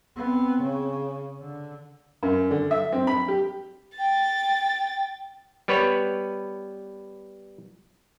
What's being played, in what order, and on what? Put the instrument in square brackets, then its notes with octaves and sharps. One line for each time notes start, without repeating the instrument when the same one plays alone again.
[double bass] B3 C4
C#3
D3
[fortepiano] F#2
D3
E5
C4
B5
G4
[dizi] G5 [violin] A6
[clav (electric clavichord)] G3 B3 B4 C#5